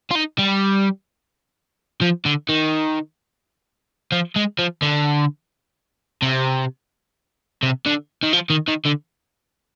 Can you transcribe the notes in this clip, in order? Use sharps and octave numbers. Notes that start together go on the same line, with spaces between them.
F4
D#4
G3
F3
D3
D#3
F3
G#3
F3
D3
C3
C3
D3
D#3
F3
D#3
D#3
D3